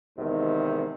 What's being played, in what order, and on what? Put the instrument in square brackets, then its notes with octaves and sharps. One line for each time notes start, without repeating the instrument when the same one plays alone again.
[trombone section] E2 G#2 C3 D#3